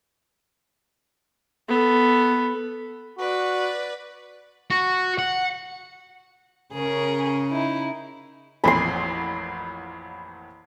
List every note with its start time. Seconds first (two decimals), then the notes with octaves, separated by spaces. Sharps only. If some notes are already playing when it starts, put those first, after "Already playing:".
1.68 B3 A4
3.19 F#4 B4 D5
4.70 F#4
5.19 F#5
6.74 C#3 C#4 G#4 A#4
7.51 D#4 E4
8.64 A1 F2 A#2 B5 C6